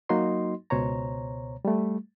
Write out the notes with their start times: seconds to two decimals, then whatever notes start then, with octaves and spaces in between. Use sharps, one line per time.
0.09 F#3 A#3 D#4 F#4 D#5 C6
0.70 C#2 B2 C5 C#5 A#5
1.65 G3 A3